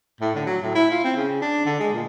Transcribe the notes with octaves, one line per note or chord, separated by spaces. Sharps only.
A2
D3
F#3
A2
E4
F4
C4
C#3
D4
D3
G#3
A#2